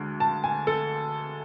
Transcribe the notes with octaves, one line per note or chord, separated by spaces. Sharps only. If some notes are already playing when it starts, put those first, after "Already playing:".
Already playing: D2 D3 G#3
A5
G#5
A4